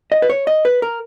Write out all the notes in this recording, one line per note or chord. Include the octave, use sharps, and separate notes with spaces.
D#5
B4
C#5
D#5
B4
A#4